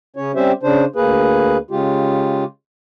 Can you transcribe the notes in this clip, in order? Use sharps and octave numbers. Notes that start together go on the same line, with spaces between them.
C#3 C#4 C#5
G3 C4 C#4 G4 C5 E5
C#3 D4 C5
D2 A#3 G#4 B4
C#3 G#3 F4 G4